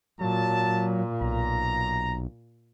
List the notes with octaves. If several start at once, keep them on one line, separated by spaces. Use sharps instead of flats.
A#2 F#3 A5
B1 A#5